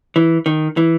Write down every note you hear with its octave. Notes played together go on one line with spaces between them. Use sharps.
E3
D#3
E3